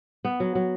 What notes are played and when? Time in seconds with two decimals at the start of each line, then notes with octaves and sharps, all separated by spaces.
0.25 B3
0.40 F#3
0.55 F#3